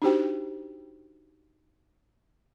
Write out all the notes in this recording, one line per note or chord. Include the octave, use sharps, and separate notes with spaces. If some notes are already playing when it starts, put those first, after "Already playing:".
D4 D#4 F#4 G4 C5 G5